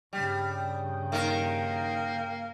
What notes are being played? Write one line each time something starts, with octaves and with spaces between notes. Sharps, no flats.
G2 C#3 G3 G5
D#3 A#3 A#4